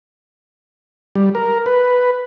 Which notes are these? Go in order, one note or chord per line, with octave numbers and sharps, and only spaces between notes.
G3
A#4
B4